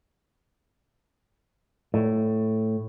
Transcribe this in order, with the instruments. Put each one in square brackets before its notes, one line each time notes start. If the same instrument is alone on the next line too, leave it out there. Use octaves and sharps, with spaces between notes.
[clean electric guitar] A2